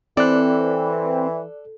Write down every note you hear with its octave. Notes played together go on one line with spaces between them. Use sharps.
E3 C4 A4 D5 F#6